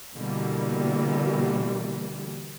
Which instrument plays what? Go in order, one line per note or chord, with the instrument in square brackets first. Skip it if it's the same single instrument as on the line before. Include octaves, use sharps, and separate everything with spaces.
[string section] B2 D3 E3 G3 A#3